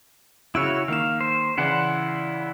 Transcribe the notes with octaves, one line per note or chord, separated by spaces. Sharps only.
C#3 E4 F#4 C#5 E6 D7
D#3 A#3 F5 E7
C5
C#3 E3 E4 D5 F#5 C6